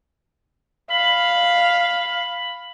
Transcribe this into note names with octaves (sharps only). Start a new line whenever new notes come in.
F5 B5